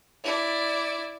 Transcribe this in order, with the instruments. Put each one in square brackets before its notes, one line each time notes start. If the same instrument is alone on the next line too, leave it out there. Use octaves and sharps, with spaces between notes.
[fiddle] E4 D5